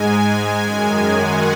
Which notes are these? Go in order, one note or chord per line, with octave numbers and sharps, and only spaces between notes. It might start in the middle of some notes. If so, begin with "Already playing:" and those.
Already playing: G#2 G#3 G#5
F#2 D#3 G#3
F#5